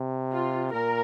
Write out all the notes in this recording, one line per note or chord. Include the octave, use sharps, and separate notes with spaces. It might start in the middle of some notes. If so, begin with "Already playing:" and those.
Already playing: C3
F4
A#2 A#4